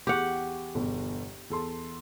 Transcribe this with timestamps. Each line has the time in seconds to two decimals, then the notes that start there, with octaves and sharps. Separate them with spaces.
0.07 E2 G4 G#4 F#5 C#6
0.75 G1 E2 B2
1.50 E2 A4 C6